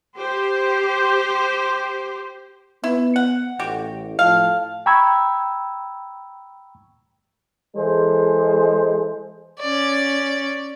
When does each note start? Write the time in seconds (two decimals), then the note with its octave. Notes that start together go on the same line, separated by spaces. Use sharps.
0.17 G4 C5
2.84 B3 E4
3.16 F#5
3.59 A1 F#4 G4
4.19 A2 F3 F5 A5
4.86 G5 A#5 B5 C#6 E6 G#6
7.76 E3 G#3 G#4 A4 C5
9.60 C#4 D5